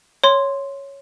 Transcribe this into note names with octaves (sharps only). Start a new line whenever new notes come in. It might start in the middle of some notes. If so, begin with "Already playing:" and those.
C#5 C6